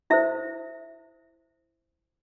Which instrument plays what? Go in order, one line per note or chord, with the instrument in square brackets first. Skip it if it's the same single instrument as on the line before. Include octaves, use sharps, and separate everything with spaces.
[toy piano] E4 A4 C5 E5